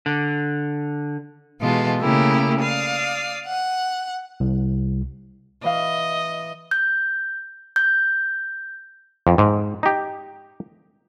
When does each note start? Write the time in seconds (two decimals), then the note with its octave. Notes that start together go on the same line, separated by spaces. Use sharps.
0.06 D3
1.61 B2 E3 G#3 F4 A4
2.01 C#3 A3 A#3 E4 G4
2.60 D5 F5 D#6
3.46 F#5
4.40 C2
5.64 E3 D#5 F5
6.71 G6
7.76 G6
9.27 F2
9.38 G#2
9.83 D#4 G4